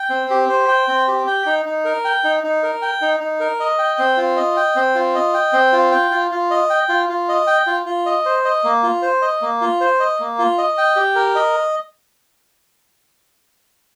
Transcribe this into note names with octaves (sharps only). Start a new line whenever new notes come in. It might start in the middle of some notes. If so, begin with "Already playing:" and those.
Already playing: G5
C4
G4
C5
G5
C4
G4
G5
D#4
D#4
A#4
G5
D#4
D#4
A#4
G5
D#4
D#4
A#4
D#5
G5
C4
F4
D#5
G5
C4
F4
D#5
G5
C4
F4
G5
F4
F4
D#5
G5
F4
F4
D#5
G5
F4
F4
D#5
C5
D#5
A#3
F4
C5
D#5
A#3
F4
C5
D#5
A#3
F4
D#5
G5
G4
A#4
D#5